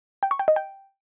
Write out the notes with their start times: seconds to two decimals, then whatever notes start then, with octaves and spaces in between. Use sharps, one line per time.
0.23 G5
0.31 C#6
0.39 G5
0.48 D#5
0.56 G5